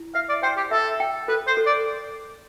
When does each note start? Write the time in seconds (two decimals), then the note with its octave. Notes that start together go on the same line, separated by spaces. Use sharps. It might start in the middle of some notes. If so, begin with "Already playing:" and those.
Already playing: E4
0.15 E5 F5
0.29 D5
0.43 C5 G5
0.57 G4
0.71 A4 E5
1.00 G5
1.28 A4 B4
1.47 C5
1.57 A4
1.66 D5